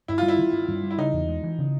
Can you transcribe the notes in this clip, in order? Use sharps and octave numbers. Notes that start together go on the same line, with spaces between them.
G2 E4
G3 F4
E4
D#3
G2
G2
G3
E4
C#3 D#4
E2
G#3
E3
C#3